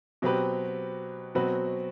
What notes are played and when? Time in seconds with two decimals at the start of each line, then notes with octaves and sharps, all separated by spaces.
0.22 B2 F#3 C4 G4 B4
1.35 B2 F#3 C4 F#4 B4